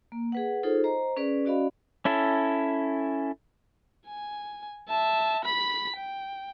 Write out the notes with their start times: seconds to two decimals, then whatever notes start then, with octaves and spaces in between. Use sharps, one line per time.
0.12 A#3
0.32 G#4 B4 F#5
0.63 D#4 F4 G#4 A4 C5
0.84 C5 D#5 A#5
1.17 C#4 G#4 B4 D5
1.45 C#4 F#4 D5 D#5 F5 B5
2.05 C#4 E4 A4
4.08 G#5
4.89 E5 A5
5.45 B5 B6
5.97 G5